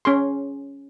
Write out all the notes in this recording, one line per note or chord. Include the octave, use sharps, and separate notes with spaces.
C#4 G#4 C6